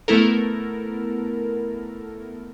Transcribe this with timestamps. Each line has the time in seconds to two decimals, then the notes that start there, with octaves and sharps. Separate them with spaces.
0.08 A3 B3 E4 A4 A#4